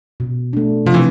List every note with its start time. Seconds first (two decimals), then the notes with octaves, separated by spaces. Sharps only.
0.20 B2
0.53 A3 D4
0.86 C3 F3
0.94 E3